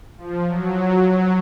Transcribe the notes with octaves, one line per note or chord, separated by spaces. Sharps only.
F3
F#3
F#3